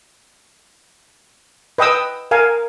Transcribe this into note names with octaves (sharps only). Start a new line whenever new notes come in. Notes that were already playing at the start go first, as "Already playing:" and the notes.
B4 D#5 G5 D#6 E6
A#4 F5 G#5